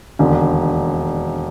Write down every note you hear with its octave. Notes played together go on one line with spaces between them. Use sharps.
E1 D#2 D3